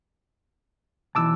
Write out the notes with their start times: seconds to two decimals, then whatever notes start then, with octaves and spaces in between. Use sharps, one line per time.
1.15 B1 E3 A5 D6 E6